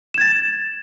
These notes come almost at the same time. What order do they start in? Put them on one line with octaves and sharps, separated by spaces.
E7 G#6 A6